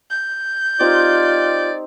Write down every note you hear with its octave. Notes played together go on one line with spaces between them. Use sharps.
G6
C4 D#4 F4 G4 D5